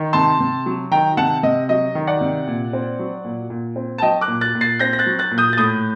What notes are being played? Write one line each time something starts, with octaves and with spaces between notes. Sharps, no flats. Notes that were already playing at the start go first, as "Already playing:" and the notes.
Already playing: D#3
C3 A5 C6
C3
F#3
D#3 G5 A#5
C3 F#5 A5
C3 D#5
F#3 D#5
D#3
D5 F#5
C3
A#2
C4
F#3
A#2
A#2
C4
A5
F#3 D#5 G5
D6 F#6
A#2
F#6 A6
A#2
A6 C7
C4 G6 A#6
A#6
F#6 A6
F#3
F#6 A6
A#2
D#6 G6
A6
A2 D#6 G6